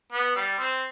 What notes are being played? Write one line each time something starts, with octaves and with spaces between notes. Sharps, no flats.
B3
G3
C4